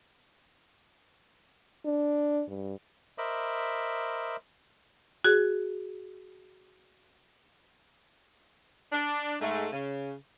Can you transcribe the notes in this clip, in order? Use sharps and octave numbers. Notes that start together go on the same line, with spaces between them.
D4
G2
A#4 C5 D#5 E5 B5 D6
F#4 G#4
D4
G#2 G#3 A3
C#3